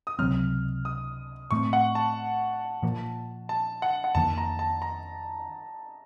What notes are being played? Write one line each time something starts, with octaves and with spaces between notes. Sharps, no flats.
D#6
C#2 C3 F#3 C4 F6
D#6
A2 A3 C4 C#6
F#5
A5
A#2 F3 A#3
A5
F#5
F#5
F2 D#3 A#3 A5
A#5
A5
A#5